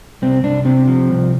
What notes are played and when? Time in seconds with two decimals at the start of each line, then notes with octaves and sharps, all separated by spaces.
0.22 C2 C4
0.44 C2 D4
0.65 C3 C4
0.88 F3
1.10 C2